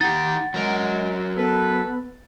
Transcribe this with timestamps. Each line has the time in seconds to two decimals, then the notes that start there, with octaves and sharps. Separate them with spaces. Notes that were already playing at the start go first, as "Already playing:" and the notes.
0.01 D#4 G4 F#5 A6
0.54 F#3 G#3 A#4
1.36 B3 A4 B4